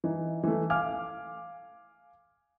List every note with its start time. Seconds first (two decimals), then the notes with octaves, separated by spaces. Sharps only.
0.04 E3 D#4
0.44 E3 A3
0.70 F5 G#5 D6 F6